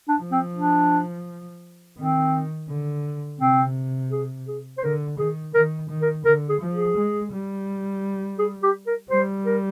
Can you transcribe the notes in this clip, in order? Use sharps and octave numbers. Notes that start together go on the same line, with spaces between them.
D4
F3
C4
D4
D#3 C4
D3
C3 C4
G#4
G#4
C5
D3 A#4
D#3 G#4
D#3 A#4
D#3
A#4
D3 A#4
G#4
F3
G#4
G#3
G3
G#4
G4
A#4
G3 C5
A#4